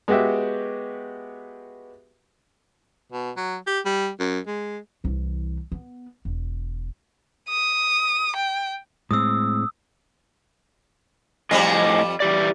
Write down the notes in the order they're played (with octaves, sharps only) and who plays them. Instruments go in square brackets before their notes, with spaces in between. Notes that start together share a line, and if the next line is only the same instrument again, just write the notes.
[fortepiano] G#3 B3 F#4 G4 E5
[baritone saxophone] B2
F#3
G4
G3
F#2
G#3
[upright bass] C2 E3
B3
E1
[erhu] D#6
G5
[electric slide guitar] A2 G#3 C4 [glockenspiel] D#6 E6
[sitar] F2 F3 G3 [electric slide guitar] A2 D#5 G#5
[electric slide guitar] E3 G4 D5